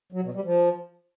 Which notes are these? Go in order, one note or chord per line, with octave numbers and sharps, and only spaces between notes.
F#3
B2
G3
F3